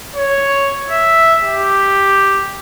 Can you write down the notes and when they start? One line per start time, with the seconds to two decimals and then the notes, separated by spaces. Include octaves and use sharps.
0.15 C#5
0.90 E5
1.43 G4